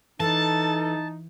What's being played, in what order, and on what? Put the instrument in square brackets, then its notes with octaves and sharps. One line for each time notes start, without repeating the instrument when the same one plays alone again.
[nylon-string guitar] E3 [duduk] D#4 [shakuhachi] A4 [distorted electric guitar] A5